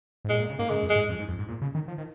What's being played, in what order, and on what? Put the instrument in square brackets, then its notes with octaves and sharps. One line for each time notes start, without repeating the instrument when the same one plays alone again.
[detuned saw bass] G#2
[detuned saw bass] A#2 [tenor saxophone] G#3
[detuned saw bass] A#2
C#3
[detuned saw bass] G#2 [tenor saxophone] A#3
[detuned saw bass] C#3 [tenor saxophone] G#3
[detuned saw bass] F2
[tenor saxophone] G#3
[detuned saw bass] G#2
F2
G#2
F2
G#2
A#2
C#3
D#3
F3
D#3